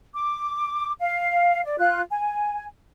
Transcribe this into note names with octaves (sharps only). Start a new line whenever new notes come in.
D6
F5
D5
F4 F#6
G#5